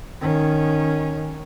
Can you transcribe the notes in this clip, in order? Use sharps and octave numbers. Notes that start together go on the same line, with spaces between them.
D#3 C#4